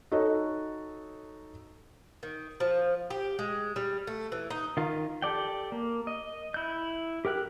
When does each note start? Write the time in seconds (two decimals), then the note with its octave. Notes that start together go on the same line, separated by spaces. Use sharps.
0.12 D#4 F#4 A4 C#5 D#5
2.23 D#3
2.60 F3
3.10 G4
3.39 G#3
3.76 G3
4.07 A3
4.32 E3
4.50 D#4
4.77 D#3 F4
5.22 G4 A4 D5 G5
5.72 A#3
6.07 D#5
6.54 E4 G6
7.25 G4 A#4 G5 F#6